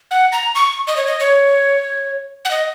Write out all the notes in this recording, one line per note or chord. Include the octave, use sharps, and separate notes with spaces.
F#5
A#5
C#6
D#5
C#5
D#5
C#5
F#5
D#5